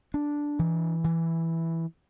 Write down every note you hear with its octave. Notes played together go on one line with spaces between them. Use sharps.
D4
E3
E3